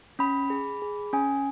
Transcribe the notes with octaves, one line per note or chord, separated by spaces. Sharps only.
C#4 B5
G#4
G#4
C#4 G#5